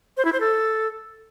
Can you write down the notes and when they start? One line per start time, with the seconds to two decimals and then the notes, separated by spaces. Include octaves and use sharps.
0.17 C5
0.25 E4
0.33 C5
0.40 A4